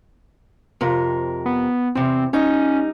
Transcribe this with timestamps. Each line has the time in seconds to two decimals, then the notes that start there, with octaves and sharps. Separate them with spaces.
0.81 F2 C3 A#4
1.46 B3
1.95 E2 C3 C4
2.33 G3 C#4 D#4